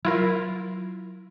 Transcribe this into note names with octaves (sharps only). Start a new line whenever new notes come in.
F#3 E4 F4 A#4